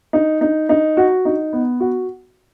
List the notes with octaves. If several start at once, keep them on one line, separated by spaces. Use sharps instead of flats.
D#4
D#4
D#4
F#4
D#4
B3
F#4